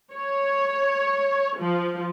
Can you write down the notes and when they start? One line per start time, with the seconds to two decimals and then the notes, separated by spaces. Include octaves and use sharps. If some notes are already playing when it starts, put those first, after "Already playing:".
0.14 C#5
1.58 F3